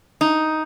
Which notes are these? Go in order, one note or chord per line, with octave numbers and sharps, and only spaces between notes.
D#4